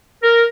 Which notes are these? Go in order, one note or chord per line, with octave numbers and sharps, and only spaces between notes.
A#4